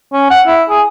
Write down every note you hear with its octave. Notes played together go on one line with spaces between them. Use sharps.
C#4
F#5
E4
G#4